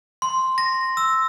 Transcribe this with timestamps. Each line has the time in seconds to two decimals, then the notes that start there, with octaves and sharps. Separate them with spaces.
0.22 C6
0.58 A#6
0.97 E6